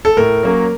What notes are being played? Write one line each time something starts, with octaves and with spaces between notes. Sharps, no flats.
A4
A2 A#4
F#3 A#3 C#4